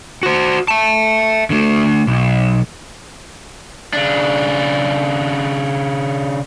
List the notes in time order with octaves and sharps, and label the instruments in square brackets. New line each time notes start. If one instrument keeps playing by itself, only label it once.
[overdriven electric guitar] F#4 C5
E5 A5
D3 A3
B1
C#3 D4